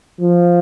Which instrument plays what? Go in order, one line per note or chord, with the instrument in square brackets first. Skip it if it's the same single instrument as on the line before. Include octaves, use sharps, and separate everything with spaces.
[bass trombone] F3